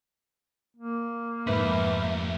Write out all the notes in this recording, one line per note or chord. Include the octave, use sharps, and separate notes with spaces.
A#3
F2 G#2 D#4 B4 E5 B5